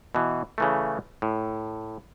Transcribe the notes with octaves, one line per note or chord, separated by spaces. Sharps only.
B2 E3
C#3 E3 A3
A2